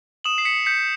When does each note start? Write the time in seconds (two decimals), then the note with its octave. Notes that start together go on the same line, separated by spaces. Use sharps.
0.24 D#6 E7 F#7
0.38 C7
0.45 B6 C#7
0.66 G6 B6 C#7